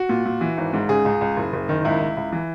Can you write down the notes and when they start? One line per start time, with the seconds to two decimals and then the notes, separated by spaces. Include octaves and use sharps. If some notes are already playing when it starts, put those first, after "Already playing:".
Already playing: F#4
0.09 A#2
0.26 A#2
0.41 E3
0.57 G#1
0.73 G#2
0.89 C#3 G#4
1.05 C#2
1.21 C#2
1.37 F#1
1.53 F#1
1.69 D#3
1.85 C#2 E4
2.01 C#2
2.17 C#2
2.32 E3